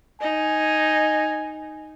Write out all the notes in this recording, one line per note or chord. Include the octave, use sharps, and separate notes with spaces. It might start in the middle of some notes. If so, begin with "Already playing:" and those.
D#4 G#5